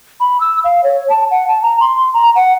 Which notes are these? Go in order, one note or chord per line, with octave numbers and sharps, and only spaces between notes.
B5
E6
F5
C#5
A5
F#5
A5
A#5
C6
A#5
F#5